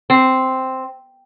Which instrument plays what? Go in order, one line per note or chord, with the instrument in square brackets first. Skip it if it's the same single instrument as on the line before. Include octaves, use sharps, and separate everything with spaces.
[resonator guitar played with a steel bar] C4